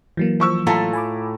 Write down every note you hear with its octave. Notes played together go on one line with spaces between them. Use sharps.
E3 F#3 A#3
F3 C#6 E6
A2 A3 F4 A5 A#5
G#5 B5 D6